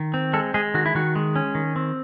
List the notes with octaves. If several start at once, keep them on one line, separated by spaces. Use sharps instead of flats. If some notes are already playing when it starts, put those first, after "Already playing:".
Already playing: D#3
C4
G#3 A4
G#3 G#4
D#3 F#4
E4
D#3 F#4
G#3
C#4
D#3
C4